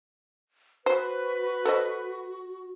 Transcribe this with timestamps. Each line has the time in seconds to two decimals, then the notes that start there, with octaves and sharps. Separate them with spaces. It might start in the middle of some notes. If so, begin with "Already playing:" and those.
0.86 F#4 B4 C5
1.65 A4 C5 D#5